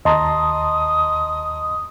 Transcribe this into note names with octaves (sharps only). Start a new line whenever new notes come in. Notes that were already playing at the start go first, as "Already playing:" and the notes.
D#2 D#5 A5 A#5 C6 D#6